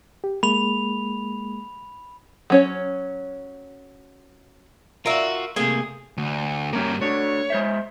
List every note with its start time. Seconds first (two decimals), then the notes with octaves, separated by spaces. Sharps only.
0.24 G4
0.43 G#3 A#3 B5 F7
2.50 F#3 C#4 C#5
5.06 F4 F#4 A#4 E5
5.56 C3 A3 A#3 G#4
6.18 D2
6.73 G2 A#3 C#4 G4 A#4
7.01 A3 D4 F#4 C#5
7.50 G#3 C5 E5